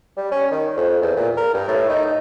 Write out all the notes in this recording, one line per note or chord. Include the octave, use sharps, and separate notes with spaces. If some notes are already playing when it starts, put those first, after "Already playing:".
G3
C#4
D#3
F2
E2
A#2
A#4
G2
A2
D#4
D#4